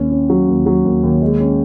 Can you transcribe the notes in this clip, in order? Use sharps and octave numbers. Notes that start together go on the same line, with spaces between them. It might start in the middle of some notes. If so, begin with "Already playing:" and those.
Already playing: D#2 C#4
C#4
F#3
D#2
F#3
D#2
D#2
G#3
C#4